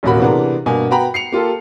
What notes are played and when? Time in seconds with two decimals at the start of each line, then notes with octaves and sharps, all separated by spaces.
0.03 D#1 A1 B2 A#3 F#4 B5
0.20 C3 E3 B3 D4 G#4 A#4
0.66 G2 B2 A#3 G#5
0.90 B3 F#4 G5 A#5 B5
1.14 C7 C#7 F7
1.32 A#3 F4 G4 A4